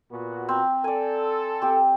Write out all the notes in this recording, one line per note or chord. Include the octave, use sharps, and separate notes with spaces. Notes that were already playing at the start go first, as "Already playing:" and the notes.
A#2 B3 F#4
C4 A#5
A4 D5 G#5
C4 G4